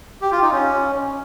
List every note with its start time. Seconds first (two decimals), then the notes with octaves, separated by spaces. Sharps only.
0.22 G4
0.32 F4
0.42 D#4
0.52 C#4